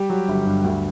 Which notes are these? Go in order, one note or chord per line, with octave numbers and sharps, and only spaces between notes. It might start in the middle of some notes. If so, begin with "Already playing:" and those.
Already playing: G3 G4
F#3
G1
G2
D2